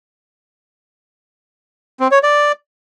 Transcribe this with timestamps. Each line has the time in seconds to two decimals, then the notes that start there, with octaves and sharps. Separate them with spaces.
2.00 C4
2.12 C#5
2.23 D5